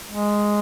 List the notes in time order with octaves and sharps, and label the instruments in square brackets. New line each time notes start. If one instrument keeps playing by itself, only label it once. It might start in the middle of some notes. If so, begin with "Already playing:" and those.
[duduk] G#3